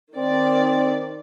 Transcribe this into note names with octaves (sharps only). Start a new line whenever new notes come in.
D#3 C4 D5